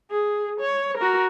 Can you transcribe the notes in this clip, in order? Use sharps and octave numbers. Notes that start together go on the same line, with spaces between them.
G#4
C#5
F#4 A#4